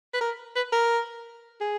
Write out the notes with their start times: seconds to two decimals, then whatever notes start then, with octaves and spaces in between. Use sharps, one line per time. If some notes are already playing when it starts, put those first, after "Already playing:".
0.14 B4
0.21 A#4
0.56 B4
0.73 A#4
1.61 G#4